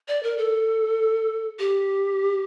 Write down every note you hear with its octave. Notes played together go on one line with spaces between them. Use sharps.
D5
A#4
A4
G4